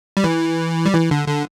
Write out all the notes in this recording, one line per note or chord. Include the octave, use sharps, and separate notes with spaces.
G3
E3
G3
E3
D3
D3